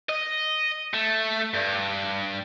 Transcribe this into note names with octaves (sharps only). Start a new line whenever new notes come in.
D#5
A3
G2